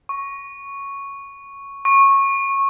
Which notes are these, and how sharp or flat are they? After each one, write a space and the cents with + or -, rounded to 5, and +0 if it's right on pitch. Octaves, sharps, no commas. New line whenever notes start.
C#6 +0
C#6 -15